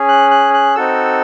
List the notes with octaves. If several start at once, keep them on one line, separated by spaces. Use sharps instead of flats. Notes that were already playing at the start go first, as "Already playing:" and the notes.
Already playing: C#4 G#4
F#6
F#6
F#6
C4 D#4 F#4 A4 E6